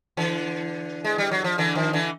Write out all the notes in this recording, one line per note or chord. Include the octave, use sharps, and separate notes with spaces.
D3 E3
G#3
G3
F#3
F3
D3 E3
D#3 F3
D3 E3